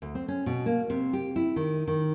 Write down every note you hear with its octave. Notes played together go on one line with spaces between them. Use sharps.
D2
C4
C#4
B2
A#3
C3
G4
E4
D#3
D#3